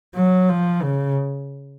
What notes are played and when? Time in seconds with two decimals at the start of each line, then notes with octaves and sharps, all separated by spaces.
0.15 F#3
0.49 F3
0.83 C#3